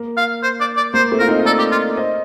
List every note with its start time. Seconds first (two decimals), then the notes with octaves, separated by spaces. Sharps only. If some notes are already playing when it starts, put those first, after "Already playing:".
Already playing: A#3
0.17 F5
0.43 C5
0.60 D5
0.77 D5
0.94 A#3 C5
1.11 A3 C4
1.19 F4 A#4
1.28 C4 D#4
1.39 D#5
1.45 A4 A#4 D5
1.59 G4
1.71 F4
1.97 C5 D#5